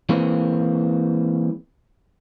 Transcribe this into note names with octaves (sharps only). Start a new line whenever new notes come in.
E3 G#3 A#3 C4 B4